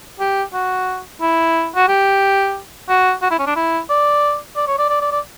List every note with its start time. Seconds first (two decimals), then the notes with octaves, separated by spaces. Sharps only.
0.20 G4
0.53 F#4
1.21 E4
1.76 F#4
1.88 G4
2.89 F#4
3.22 F#4
3.31 E4
3.39 C#4
3.47 D4
3.56 E4
3.89 D5
4.56 D5
4.67 C#5
4.78 D5
4.90 D5
5.01 D5
5.12 D5